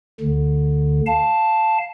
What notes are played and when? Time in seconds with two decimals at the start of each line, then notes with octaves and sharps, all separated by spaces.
0.21 D2 D3
1.06 F5 A5